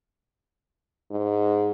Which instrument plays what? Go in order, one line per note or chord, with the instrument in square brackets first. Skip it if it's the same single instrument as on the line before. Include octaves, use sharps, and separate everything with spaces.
[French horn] G#2